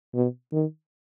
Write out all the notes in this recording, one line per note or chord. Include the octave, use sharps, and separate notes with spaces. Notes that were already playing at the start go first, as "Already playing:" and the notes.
B2
D#3